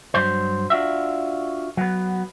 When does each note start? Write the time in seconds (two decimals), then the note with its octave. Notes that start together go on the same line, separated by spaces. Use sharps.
0.14 G2 F#3 C5
0.70 D4 F4 F#4 E5
1.77 F#3 B3